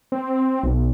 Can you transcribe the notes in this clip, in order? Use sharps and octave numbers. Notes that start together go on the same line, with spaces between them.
C4
B1